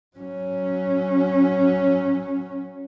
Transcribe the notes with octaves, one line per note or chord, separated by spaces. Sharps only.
F#3 C#4